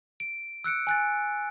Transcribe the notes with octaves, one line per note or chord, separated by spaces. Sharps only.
D7
E6 F#6 C#7 D7
G#5 F#6 A6